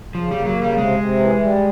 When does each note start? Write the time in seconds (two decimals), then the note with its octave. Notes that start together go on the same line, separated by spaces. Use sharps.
0.15 C#3 F3
0.31 G3
0.36 A#3
0.46 F#3
0.56 C#3
0.63 G3
0.78 C3 G#3
0.99 C3
1.19 E3
1.40 G3